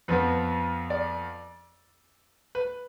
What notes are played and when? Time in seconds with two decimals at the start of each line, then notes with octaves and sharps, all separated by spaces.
0.08 F2 F3 B3 B4
0.90 D5
2.55 B4